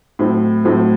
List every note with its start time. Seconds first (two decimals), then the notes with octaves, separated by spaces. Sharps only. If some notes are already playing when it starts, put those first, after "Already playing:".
0.19 A2 F#3 C4
0.65 A2 F#3 C4